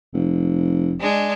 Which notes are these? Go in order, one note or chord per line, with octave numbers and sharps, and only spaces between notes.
F1
G#3 D4